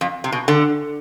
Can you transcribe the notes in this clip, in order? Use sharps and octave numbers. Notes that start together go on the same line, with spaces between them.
F2
C3
B2
D3